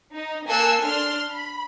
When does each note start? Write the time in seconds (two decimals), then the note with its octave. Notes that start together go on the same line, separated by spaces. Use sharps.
0.15 D#4
0.48 A#3 A4 G#5 E6 F#6 C7
0.81 D4 C6 F6
1.33 B5